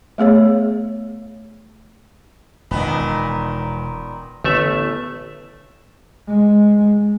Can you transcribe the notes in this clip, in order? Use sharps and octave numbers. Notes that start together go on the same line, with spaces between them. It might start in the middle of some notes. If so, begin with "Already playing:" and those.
A3 B3 G#4 C#5
E1 A#2 D#3 B3
A1 D3 A3 B3 E5
G#3